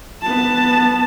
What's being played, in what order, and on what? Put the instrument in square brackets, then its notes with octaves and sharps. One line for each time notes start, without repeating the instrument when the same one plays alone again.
[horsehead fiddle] B3 A5